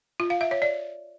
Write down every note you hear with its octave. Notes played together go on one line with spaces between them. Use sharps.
F4
F5
E5
C#5
D5